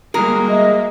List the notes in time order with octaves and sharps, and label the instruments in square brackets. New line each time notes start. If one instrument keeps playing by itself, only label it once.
[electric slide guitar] G3 F#4 G#4 [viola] G#3 A#3 [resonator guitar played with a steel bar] A#4
[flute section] D#5 E5